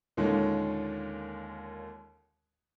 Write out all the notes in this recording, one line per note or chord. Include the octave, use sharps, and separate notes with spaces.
D#2 A#2 D3 D#3 G#3 C#4